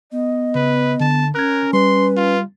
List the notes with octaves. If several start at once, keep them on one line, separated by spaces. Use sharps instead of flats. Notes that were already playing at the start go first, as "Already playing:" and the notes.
B3 D#5
C#3 B4
D3 A5
C#4 A#4 F#6 G#6
G3 B4 C6
F4